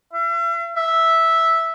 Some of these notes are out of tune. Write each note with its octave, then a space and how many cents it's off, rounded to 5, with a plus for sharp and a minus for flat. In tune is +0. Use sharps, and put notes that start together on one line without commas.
E5 +45
E5 -5